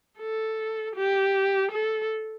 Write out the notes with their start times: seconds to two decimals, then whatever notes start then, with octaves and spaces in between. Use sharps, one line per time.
0.19 A4
0.96 G4
1.72 A4